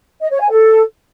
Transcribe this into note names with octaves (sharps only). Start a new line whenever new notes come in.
D#5
C#5
G#5
A4